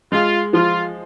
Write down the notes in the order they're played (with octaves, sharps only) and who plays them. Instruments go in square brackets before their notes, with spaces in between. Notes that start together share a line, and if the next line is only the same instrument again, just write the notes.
[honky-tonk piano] G#3 [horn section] F4
[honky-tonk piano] F3 [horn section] F4